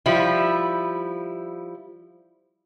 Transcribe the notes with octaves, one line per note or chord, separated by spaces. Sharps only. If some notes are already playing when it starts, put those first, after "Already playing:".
F3 G3 E4